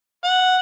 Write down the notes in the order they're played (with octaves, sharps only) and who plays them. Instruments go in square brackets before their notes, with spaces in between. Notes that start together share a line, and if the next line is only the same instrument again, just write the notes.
[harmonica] F#5